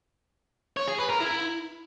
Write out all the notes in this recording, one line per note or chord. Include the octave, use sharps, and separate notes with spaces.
C#5
G#4
B4
A#4
E4